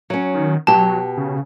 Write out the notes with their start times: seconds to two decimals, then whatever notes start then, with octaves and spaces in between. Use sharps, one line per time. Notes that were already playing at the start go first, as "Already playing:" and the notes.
0.10 F#3 C#4
0.34 D#3
0.67 B2 F#3 G4 A5
1.17 C#3